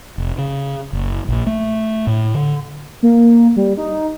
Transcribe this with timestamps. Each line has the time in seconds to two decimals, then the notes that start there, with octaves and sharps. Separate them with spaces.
0.18 F1
0.38 C#3
0.93 F#1
1.28 A#1
1.47 A3
2.07 A2
2.34 D3
3.03 A#3
3.56 G3
3.77 D#4